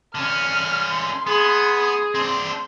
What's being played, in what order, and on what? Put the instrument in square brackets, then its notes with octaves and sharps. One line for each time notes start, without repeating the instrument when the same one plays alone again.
[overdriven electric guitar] D3 C#4 [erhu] F6
[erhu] C6
[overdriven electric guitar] B3 [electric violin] G#4
[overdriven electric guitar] C4 D4 [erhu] C6